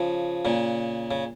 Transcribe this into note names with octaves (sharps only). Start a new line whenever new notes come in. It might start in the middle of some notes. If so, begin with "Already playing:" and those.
Already playing: C#3 F3
A#2 C#3
C#3